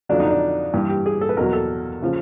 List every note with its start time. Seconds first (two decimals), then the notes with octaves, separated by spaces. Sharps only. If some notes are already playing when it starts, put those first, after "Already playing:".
0.09 F2 D3 F#3 D4
0.20 D#4
0.30 D4
0.74 G2 E3
0.89 G4
1.06 G#4
1.21 A4
1.29 B4
1.37 E2 B2 F#3 A#4
1.53 A4
2.02 C#3 F3